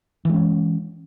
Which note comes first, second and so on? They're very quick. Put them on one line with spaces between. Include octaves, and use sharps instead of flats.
E3 G#3 C#4